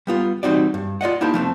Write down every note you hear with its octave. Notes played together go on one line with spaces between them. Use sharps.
G3 B3 F4
E3 G3 C4 D#4 F#4 D5
G2
F4 D5 D#5 F#5
A#3 D#4 E4 G4 C5 A5
F3 A3 A#3 C4